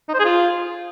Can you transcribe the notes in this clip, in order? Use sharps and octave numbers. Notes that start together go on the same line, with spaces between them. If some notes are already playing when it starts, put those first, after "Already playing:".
D#4
C5
G#4
F4